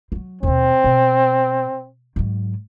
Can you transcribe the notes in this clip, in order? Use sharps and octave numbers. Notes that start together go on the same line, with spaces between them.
F3 F#3
D#2 B2 C4
B2
G#2 F#3